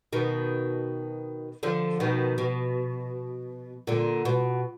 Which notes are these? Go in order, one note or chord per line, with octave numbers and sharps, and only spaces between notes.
B2 D#3
D3 F3
B2 D#3
B2
A#2 D3
B2